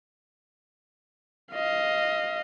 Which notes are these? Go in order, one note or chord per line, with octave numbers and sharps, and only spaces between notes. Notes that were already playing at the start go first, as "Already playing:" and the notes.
D#5 F5